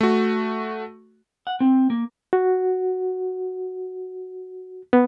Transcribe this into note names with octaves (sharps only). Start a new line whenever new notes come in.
A3 F#4
F#5
C4
A#3
F#4
B3